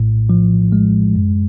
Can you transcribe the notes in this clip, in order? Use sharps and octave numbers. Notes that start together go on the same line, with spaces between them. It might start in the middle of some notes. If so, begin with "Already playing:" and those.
Already playing: A#1 A2
F3
G#3
F#2